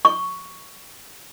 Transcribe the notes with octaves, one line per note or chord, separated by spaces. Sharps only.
C#6